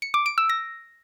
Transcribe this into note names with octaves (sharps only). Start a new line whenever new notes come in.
C#7
D6
D7
E6
A#6